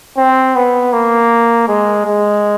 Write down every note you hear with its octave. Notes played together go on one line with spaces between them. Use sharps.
C4
B3
A#3
G#3
G#3